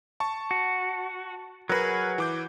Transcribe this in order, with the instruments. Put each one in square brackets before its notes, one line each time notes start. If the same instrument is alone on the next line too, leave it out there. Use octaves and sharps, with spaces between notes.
[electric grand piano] A5 C#6
[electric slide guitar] F#4
[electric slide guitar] F#3 F#4 G#4 [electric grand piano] A#4 B4
[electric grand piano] E3 D6 G6